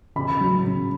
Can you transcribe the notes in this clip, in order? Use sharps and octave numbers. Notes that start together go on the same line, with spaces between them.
C#3 B5
F#3
C#3